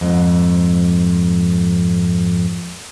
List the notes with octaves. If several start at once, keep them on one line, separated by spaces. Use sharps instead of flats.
F2 G#2